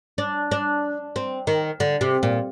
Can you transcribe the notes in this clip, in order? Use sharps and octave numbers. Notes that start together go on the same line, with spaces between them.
D4
D4
C4
D#3
D3
C3
A#2